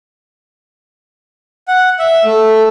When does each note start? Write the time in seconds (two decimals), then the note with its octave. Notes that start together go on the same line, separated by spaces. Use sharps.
1.68 F#5
1.99 E5
2.25 A3